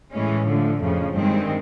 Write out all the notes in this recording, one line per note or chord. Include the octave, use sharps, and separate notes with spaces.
A2 E3 G#3 C#4
D3 F3 A3
F2 C#3 F3
G2 D#3 G#3 C4